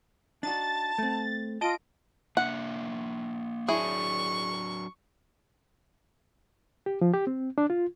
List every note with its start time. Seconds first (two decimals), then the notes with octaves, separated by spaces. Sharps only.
0.43 D4 D#4 F#4 A5 A6
0.98 A3 C4
1.61 F4 D#5 A5 D7
2.37 A#3 D4 E5 F#5
3.69 F#3 D4 E4 G#4 C#6
6.86 G4
7.01 F3
7.14 G4
7.27 C4
7.58 D4
7.70 F4